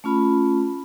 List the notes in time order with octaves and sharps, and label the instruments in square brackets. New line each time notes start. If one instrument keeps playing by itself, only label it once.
[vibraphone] A3 C#4 F4 B5